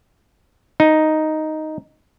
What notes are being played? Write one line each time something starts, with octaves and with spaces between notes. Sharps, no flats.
D#4